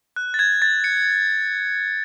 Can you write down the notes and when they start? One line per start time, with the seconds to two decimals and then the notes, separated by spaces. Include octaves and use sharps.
0.16 F#6
0.34 A6
0.39 G#6
0.62 A6
0.84 C#7